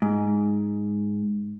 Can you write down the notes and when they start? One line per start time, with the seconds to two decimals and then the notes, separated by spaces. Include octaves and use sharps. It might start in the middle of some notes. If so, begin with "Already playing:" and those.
0.02 G#2